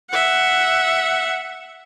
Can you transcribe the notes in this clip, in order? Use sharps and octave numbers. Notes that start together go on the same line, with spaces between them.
E5 F#5